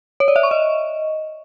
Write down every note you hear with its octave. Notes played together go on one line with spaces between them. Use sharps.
C#5
D5
E5
C#6
D#5